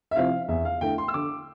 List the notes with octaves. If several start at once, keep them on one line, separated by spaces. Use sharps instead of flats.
E5
C3 F3 C4 E4 F5
E2 E5
F5
D3 A3 E4 G5
C6
E6
D3 D6